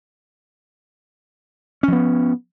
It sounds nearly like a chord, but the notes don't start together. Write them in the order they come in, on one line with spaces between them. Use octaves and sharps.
C#4 F3 B3